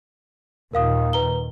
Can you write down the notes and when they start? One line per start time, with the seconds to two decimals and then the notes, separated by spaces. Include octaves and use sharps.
0.73 D#2 A#2 D#3 A#4 F5 D#6
1.13 B4 A#5 G7